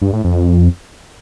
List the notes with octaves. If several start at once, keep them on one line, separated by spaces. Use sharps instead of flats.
G2
A2
F2